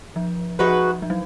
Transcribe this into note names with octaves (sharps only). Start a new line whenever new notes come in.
F3
F3 G#3 D#4 F#4 B4
F3
F#3